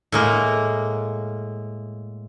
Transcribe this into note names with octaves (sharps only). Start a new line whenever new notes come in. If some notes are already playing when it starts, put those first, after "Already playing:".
A2 G#3 A#3